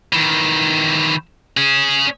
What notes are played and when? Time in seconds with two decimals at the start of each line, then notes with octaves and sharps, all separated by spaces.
0.13 D#3 E3
1.57 C#4 G#4